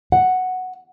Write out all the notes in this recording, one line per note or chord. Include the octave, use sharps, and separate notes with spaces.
F#5